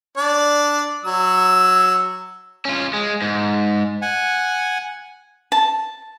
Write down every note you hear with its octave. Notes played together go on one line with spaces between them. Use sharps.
D4 D5
F#3 E6
C#4 F4
G#3
G#2
F#5 G#5
A5